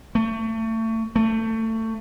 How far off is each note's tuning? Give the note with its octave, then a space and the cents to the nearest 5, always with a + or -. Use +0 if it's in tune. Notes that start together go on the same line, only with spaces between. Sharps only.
A3 +30
A3 +25